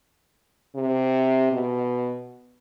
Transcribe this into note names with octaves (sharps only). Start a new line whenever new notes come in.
C3
B2